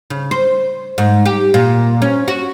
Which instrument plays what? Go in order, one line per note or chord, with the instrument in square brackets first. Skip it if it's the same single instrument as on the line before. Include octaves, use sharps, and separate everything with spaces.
[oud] C#3
C5
G#2
G4
A#2
C#4
F#4